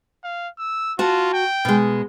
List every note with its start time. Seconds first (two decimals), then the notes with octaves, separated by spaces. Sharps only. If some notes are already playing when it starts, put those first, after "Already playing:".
0.24 F5
0.59 E6
0.99 F4 F#4 A5
1.33 G5
1.65 B2 G#3